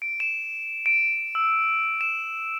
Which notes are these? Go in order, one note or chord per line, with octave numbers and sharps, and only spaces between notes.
D7
E7
D7
E6
E7